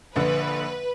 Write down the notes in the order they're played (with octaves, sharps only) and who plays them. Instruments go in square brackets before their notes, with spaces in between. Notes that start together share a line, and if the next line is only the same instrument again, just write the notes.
[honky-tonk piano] A#1 D3 [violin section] B4